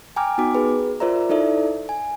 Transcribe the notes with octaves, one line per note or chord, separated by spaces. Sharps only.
G5 G#5 A#5 D6 F6
B3 D#4 F#4 D6
G#4 B4
F4 A#4 C5 D5 E5 A#5
D#4 E4 A4 D5 E5
G#5